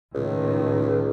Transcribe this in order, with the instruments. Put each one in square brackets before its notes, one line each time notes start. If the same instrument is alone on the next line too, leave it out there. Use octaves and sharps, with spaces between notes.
[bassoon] C#2 [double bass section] A2 D#3